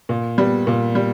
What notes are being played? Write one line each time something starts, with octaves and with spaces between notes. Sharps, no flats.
A#2
G3 B3
A#2
G3